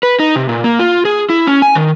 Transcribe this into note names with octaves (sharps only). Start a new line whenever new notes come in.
B4
D#4
C3
A#2
A#3
F4
G#4
E4
C#4
G#5
D#3